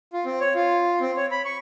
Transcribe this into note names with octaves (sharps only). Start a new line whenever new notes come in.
F4
C4
C#5
F4
C4
C#5
B5
C#6